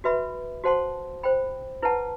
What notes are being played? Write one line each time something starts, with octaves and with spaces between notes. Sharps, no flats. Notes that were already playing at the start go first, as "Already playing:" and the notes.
F#4 B4 E5 B5
F#4 C5 F#5 A5 C6
C5 G5 B5
E4 B4 F#5 A5